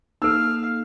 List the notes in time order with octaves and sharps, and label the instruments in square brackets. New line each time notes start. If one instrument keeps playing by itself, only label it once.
[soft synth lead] A#3 [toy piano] D#4 A4 [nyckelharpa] F5 [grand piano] E6